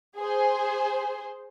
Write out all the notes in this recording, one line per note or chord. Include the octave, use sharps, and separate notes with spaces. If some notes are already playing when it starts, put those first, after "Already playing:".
G#4 C5